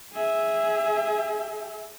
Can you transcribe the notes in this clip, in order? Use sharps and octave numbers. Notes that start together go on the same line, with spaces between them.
G#4 E5